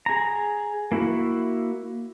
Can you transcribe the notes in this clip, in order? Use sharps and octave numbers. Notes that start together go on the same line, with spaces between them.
G#4 A#5
A#3 E4 F#4